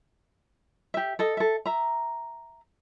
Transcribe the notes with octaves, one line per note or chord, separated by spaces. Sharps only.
G4 E5
A4 D#5
A4 E5
E5 A#5